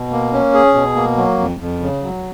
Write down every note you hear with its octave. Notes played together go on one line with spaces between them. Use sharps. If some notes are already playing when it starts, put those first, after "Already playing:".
Already playing: B2
A#3
C#4
G#4
B2
A#3
F#3
F2
F2
C#3
F#3